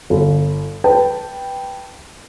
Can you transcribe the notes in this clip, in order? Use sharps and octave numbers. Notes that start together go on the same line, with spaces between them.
G1
B4 G5 A5